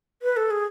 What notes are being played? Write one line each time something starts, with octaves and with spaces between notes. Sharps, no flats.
B4
A4
G#4